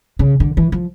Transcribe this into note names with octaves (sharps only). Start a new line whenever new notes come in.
C#3
D3
E3
F3